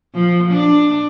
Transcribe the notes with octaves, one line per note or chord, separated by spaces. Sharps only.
F3
D4